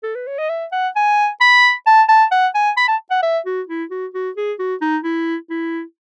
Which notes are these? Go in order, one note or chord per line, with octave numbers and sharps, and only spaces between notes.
A4
B4
C#5
D#5
E5
F#5
G#5
B5
A5
A5
F#5
G#5
B5
A5
F#5
E5
F#4
E4
F#4
F#4
G#4
F#4
D#4
E4
E4